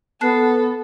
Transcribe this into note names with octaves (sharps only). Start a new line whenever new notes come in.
B3 A4 A5 F#6 C7